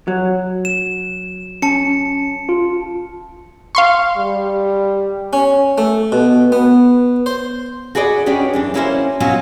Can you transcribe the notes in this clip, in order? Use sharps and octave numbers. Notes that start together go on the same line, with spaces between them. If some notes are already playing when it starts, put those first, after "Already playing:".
F#3
E7
C#4 A5 C#7
F4
F5 C6 C#6
G3
C#4
A3
B2
B3
C5
F#4 G#4 B4 D5 D#5
B3 C#4 D4 G4
F#2 E3 D4
A#3 C#4 E4 F#4 A4 C5
B2 F#3 C#4 F4 F#4